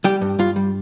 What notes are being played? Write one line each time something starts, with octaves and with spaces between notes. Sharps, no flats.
G3 G4
G2
G2 F4
G3